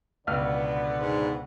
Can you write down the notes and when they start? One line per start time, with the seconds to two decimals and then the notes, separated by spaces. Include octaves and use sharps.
0.27 C#2 B2 D3 B3 B4 D5 F6
0.96 G#2